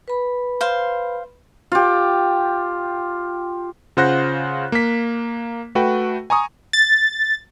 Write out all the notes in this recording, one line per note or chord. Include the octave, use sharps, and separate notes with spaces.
B4 B5
C5 F5
F4 G4
C#3 F4 C5 F#5 F#6 A#6
A#3 B6
A3 F#4 B4 G5
G#5 A#5 C#6 D#6
A6